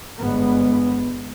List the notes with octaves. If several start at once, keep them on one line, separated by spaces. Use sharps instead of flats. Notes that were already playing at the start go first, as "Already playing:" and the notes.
G1 G#3 B3